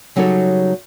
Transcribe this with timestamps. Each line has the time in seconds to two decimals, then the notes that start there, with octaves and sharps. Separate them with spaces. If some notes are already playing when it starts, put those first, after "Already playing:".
0.16 C#3 F#3 G3 D#4 A4 C#5